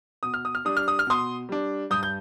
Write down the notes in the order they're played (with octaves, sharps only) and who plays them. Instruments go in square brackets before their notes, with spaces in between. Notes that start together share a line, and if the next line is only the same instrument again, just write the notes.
[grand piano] B2 D#6
F6
D#6
F6
G3 D4 D#6
F6
D#6
F6
B2 C6 D#6
G3 D4
G2 D#6 G6
G6